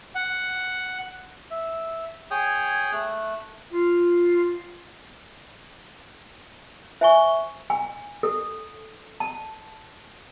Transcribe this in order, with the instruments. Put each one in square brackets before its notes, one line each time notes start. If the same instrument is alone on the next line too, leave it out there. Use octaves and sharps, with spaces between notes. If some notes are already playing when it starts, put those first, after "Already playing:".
[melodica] F#5
[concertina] E5
G#4 C#5 G5 D#6
A3 F#6
[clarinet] F4
[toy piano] C5 G#5 C#6 [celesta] E5 G7
[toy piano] G#5
A4
A5